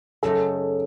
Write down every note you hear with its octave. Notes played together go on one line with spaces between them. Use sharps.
F#2 C#3 F#3 A3 D#4 A4